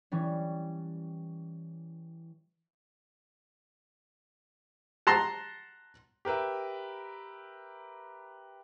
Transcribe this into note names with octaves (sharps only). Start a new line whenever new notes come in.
E3 G3 C#4
F#5 A5 A#5 C6
G4 A#4 B4 E5